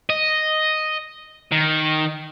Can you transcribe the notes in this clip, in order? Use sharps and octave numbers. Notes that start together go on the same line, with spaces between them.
D#5
D#3